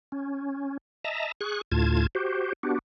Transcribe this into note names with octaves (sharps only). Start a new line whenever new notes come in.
C#4
D#5 E5 A5 A#5
G#4 C#6 F#6
D2 A2 F4 A5 G#6
F#4 G4 C5
B3 D4 F#4 G4